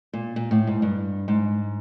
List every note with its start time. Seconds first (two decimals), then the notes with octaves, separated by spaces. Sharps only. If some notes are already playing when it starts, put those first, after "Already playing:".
0.13 A#2
0.36 A#2
0.51 A2
0.67 G#2
0.82 G2
1.28 G#2